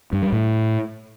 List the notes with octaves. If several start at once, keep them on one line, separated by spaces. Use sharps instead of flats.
G2
G3
A2